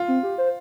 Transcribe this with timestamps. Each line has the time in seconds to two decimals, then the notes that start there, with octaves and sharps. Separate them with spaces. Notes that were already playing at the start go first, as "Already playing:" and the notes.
Already playing: F4
0.08 C4
0.23 G4
0.38 C5